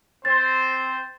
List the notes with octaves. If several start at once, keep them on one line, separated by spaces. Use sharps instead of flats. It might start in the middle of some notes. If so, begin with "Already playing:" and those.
C4 C5 A6